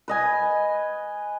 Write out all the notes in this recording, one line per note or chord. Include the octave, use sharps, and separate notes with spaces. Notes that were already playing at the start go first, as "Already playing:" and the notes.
B4 D#5 G#5